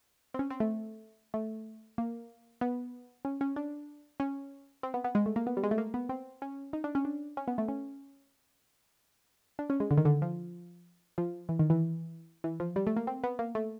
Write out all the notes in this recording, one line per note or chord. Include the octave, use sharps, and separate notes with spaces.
C4
C#4
C4
A3
A3
A#3
B3
C#4
C#4
D4
C#4
C4
B3
B3
G#3
A3
A#3
B3
G3
G#3
A3
A#3
B3
C4
C#4
D#4
D4
C#4
D4
C#4
B3
A3
C#4
D4
C#4
G#3
D3
D#3
D3
F3
F3
E3
D#3
E3
E3
F3
G3
A3
A#3
C4
B3
A#3
A3